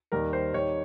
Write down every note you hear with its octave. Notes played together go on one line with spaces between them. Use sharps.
D#2 D#3 G3 A#4
C5
D#2 D#3 G3 C#5